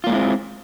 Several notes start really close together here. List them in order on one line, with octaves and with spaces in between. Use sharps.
F4 A#3 G#3 E4 C4